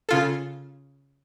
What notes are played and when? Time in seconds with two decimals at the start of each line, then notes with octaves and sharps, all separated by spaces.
0.09 C#3 F4 A4